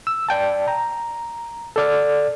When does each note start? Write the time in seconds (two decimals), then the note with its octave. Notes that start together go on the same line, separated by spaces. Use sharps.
0.07 E6
0.29 D5 G5 A5
0.68 A#5
1.76 A4 D5 F6